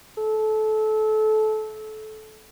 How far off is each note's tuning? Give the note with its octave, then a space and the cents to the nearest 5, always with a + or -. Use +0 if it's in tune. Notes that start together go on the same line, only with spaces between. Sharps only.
A4 -25